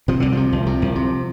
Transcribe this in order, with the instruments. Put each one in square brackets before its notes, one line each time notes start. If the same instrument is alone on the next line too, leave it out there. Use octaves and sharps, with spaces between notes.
[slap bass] C3 F3
C2 D3
C3 F3
C2
C3
C2
C3